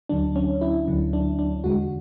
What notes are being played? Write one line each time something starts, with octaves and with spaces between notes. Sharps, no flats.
D2 D3 F#3 D4
C#4
E4
D2 D3 F#3
D4
D4
E2 D3 G#3 F#4